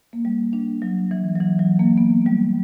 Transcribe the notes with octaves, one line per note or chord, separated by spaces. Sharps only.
A#3
G3
D4
F#3
E3
F#3
E3
F#3
A#3
B3
G3